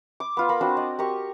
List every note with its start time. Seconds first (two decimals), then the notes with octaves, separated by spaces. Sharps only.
0.20 D6
0.37 B3 F4
0.49 F4 A#4 B5
0.61 C4 D4 F#4 C5
0.77 D5 D#5
0.99 G4 A#4 C#6